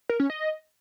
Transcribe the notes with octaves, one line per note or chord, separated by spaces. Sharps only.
A#4
C#4
D#5